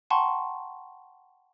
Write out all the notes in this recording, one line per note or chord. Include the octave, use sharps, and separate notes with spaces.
F#5 G5 A5 A#5 C6 C#6